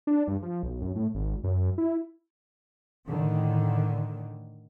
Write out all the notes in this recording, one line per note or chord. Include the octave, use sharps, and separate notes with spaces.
D4
G2
F3
B1
F#2
A2
G#1
F#2
E4
A2 D3 D#3